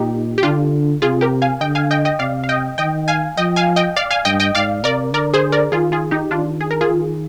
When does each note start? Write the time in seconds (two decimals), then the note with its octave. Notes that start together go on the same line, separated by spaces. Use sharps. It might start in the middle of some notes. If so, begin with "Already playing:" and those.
Already playing: A#2 D#4 G4
0.38 G4
0.43 D3 D4 F4
1.02 C3 F4 G#4
1.21 G4 A#4
1.42 F5 G#5
1.61 D3 D#5 G5
1.75 F5 G#5
1.91 D#5 G5
2.05 D#5 G5
2.19 C3 D5 F5
2.44 F5
2.49 D#5 G5
2.78 D#3 D#5 G5
3.08 F5 G#5
3.37 F3 D#5 G5
3.56 F5 G#5
3.76 D#5 G5
3.96 D5 F5
4.11 F5 G#5
4.25 G2 D#5 G5
4.40 D#5 G5
4.55 G#2 D5 F5
4.84 C3 A#4 D5
5.14 D3 A#4 D5
5.34 G#4 C5
5.52 A#4 D5
5.72 D#3 F4 G#4
5.92 F4 G#4
6.11 D#4 G4
6.31 D#3 D4 F4
6.61 G#4
6.71 A#4
6.81 F4 G#4
6.90 D#3